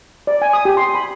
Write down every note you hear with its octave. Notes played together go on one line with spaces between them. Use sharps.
D5
G#5
D#6
G4
C6
B5